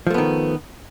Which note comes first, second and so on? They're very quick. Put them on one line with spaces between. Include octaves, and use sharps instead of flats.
F3 A3 B3 D#3